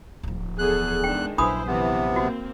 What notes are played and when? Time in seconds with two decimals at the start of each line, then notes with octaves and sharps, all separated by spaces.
0.23 D1 F3
0.59 E2 G#4 A4 F#6
1.04 D#3 G#3 D4 G5
1.38 A#1 F#3 D4 E4 B4 C5 B5 D#6
1.67 C3 E3 B3
2.16 A#3 C4 F#4